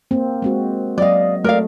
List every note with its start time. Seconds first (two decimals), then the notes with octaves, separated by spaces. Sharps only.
0.11 A#3 C4
0.42 G#3 C4 F#4
0.98 F#3 D5 D#5 F5
1.44 A3 A#4 D5 F5